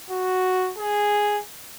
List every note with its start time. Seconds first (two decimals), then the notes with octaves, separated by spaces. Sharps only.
0.10 F#4
0.78 G#4